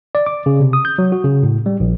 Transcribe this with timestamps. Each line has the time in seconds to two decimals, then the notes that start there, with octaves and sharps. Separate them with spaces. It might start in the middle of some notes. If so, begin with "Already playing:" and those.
0.15 D5
0.26 D6
0.46 C#3
0.60 C3
0.73 D#6
0.85 G6
0.98 F#3
1.12 F#4
1.24 C#3
1.43 A2
1.66 G3
1.80 A#1